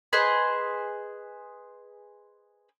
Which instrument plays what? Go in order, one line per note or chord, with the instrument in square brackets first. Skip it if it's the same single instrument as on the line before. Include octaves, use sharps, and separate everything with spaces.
[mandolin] G#4 B4 C5 D#5